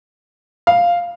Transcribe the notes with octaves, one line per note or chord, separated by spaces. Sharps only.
F5